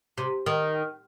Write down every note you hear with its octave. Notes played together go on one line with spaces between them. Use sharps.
C3
D#3